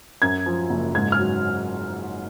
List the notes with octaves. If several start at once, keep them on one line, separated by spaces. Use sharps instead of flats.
F#2 G#6
F3
F#1
G#2 G#6
F6
F#3